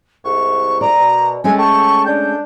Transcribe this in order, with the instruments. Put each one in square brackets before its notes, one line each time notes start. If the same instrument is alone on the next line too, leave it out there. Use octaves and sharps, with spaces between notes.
[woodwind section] C2 G#2 [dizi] C#6
[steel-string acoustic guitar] A#4 D5 [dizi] A#5
[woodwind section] B2
[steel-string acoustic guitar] G#3 A3 C#4 [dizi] G#5
[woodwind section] G5 A5 [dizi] C#6
[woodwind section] D4 [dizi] G6